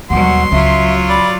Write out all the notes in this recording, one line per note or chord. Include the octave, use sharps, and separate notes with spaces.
D#2 B2 F#3 G3 F#5 C6
C#2 F#3 F4 E5
D5 B5